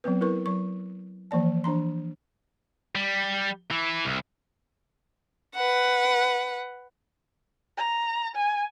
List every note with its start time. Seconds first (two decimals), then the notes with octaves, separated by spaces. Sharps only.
0.04 F#3 B3 C4 B4
0.21 E4 A#4 B4 C#6
0.46 F#3 C#6
1.31 E3 F3 A#3 D5 A5
1.64 E3 D4 A#5 C6
2.95 G3
3.71 E3
4.05 C2
5.55 B4 F#5
7.77 A#5
8.35 G#5